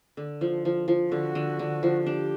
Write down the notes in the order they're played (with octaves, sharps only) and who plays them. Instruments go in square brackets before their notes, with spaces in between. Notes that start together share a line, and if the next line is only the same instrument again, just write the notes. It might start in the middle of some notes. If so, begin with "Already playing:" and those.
[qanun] D3
F3
F3
F3
[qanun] D3 [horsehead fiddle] F#4
[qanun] D3
D3
F3
[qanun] D4 [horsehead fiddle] G4